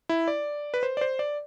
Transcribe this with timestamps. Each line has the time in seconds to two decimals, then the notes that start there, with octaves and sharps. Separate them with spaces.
0.09 E4
0.28 D5
0.74 B4
0.83 C5
0.97 D5
1.01 C5
1.19 D5